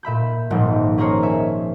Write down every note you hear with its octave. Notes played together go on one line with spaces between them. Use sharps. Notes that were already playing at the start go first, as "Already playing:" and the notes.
A#2 E5 B5 G6
D#1 G#1 A#2 F3
C#4 G#4 A#4 C5 C#5
E5 G#5